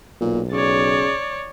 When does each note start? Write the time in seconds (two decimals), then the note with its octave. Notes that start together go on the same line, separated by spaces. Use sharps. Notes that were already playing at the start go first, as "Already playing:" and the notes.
0.21 B1 A#2
0.52 C#3 C#5 D5